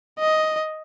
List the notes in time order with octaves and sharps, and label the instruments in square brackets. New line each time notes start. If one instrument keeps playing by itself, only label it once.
[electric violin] D#5